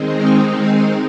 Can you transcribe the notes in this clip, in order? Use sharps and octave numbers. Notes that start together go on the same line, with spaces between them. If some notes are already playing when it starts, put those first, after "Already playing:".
Already playing: D#3 G#3 C4 D#4
C#6 F6
C6 D#6